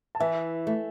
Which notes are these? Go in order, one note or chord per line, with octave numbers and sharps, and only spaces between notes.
A5
E3 E5 G#5
A3